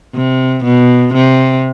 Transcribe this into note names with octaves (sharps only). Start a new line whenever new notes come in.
C3
B2
C3